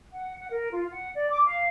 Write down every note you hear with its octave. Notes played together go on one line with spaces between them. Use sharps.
F#5
F#5
A#4
F4
F#5
D5
D6
F5